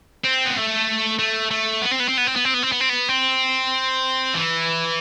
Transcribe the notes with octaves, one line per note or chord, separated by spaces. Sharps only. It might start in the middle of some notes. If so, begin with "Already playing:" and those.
C4
B3
A3
A3
A3
B3
C4
B3
C4
B3
C4
B3
C4
B3
C4
B3
C4
B3
C4
E3